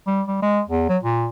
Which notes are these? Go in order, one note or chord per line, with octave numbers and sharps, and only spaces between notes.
G3
G3
G#3
E2
F#3
A#2